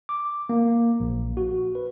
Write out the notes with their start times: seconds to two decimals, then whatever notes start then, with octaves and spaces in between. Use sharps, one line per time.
0.09 D6
0.49 A#3
1.00 A#1
1.37 F#4
1.75 B4